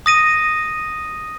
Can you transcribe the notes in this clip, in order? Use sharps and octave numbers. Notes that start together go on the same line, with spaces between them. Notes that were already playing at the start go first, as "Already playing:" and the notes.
D#6 A#6 D#7